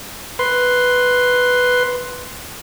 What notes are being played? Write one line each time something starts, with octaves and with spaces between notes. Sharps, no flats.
B4 C6